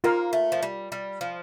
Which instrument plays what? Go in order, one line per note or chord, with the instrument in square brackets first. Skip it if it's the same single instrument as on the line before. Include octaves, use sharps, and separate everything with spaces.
[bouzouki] A#3 [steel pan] F4 A#4 F5
[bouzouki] A3
F3
G3
G3
F3